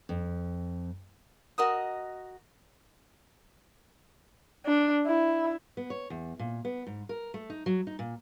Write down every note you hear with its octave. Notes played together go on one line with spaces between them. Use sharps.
F2
F#4 A#4 D#5 D#6
D4
E4
B3
C#5
E2
A#2
B3
G#2
A#4
A3
D#4
F#3
D#4
A#2